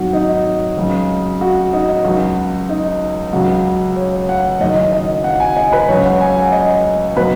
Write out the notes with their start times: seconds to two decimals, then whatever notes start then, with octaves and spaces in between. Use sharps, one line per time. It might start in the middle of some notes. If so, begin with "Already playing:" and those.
Already playing: G#1 G#2 F#3 F#4
0.13 D#4
0.77 C#2 C#3 F#3
1.41 F#4
1.73 D#4
2.05 C#2 C#3 F#3 F#4
2.69 D#4
3.33 C#2 C#3 F#3 F#4
3.96 C#5
4.29 F#5
4.61 F#1 F#2 D#3 F#3 D#5
4.92 D#5
5.24 F#5
5.40 G#5
5.56 D#5
5.73 B4
5.88 C#2 C#3 F#3 C#5
6.05 F#5
6.21 G#5
6.37 F#5
6.52 D#5
7.17 B2 F#3 B4